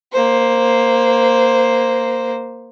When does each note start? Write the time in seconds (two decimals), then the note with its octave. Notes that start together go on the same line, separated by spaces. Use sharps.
0.12 A#3 C5